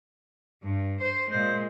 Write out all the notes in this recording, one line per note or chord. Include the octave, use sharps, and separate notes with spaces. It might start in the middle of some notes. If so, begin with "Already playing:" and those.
G2
C5
A#2 G#3 C5